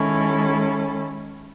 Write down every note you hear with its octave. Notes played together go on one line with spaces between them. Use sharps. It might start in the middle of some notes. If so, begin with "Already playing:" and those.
Already playing: D#3 G#3 C#4 E4 A4